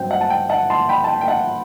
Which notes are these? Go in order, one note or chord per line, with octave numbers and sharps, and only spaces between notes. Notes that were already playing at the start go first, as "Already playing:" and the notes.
Already playing: G2 F#3 C4 G5
F#5
A5
G5
F#5 A5
A5 C6
G5 B5
A5
G5
G5
F#5 A5